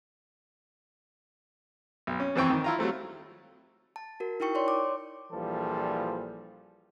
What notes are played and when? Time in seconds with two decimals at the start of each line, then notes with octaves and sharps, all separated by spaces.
2.07 B1
2.20 C#4
2.35 F2 E3 C4 G5 C#6
2.50 D#3
2.64 E4 F4 A#5
2.79 F#3 G3 A3 C4
3.96 A5
4.20 F#4 A#4
4.40 D#4 E4 A#4 G5 C#6 C#7
4.55 C#5 D5 C6
4.68 D6
5.32 A#1 A#2 E3 F3 G3 A4